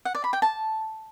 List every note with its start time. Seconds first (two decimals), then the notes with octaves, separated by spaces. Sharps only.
0.05 F#5
0.15 D5
0.24 B5
0.33 G5
0.42 A5